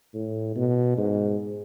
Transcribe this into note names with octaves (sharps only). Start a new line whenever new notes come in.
A2
B2
G#2